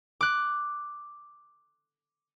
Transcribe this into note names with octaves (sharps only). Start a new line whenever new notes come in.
D6 F#6